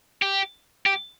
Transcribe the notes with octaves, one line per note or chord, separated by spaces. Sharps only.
G4
G4